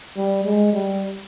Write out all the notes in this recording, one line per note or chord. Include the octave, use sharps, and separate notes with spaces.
G3
G#3
G3